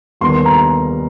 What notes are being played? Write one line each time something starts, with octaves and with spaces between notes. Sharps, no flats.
D#2 D#3 G3 B3 C6
A#5